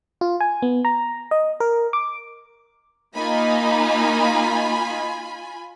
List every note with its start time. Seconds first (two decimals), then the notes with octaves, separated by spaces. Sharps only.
0.21 F4
0.40 G#5
0.62 B3
0.85 A#5
1.31 D#5
1.60 A#4
1.93 D6
3.16 A#3 D#4 F4 G#5 B5